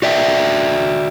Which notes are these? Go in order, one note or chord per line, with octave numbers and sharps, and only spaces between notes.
F#4 D5 E5 G5